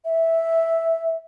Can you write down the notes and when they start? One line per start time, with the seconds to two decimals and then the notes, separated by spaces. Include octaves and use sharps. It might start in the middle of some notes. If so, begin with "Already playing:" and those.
0.05 E5